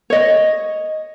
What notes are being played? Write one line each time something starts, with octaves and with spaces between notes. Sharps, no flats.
C#5 D#5